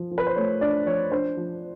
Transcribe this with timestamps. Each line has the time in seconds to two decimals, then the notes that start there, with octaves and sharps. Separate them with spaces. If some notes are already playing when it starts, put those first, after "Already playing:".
Already playing: F3
0.11 F3
0.18 B4
0.27 C5
0.36 A3 C#5
0.61 D4 D5
0.87 F3 C#5
1.12 D4 C5
1.37 F3